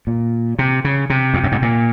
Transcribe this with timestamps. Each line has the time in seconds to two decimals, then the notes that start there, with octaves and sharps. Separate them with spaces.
0.07 A#2
0.59 C3
0.84 C#3
1.10 C3
1.34 F2
1.44 F#2
1.52 G#2
1.62 A#2